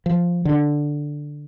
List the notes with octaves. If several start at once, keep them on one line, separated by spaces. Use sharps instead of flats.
F3
D3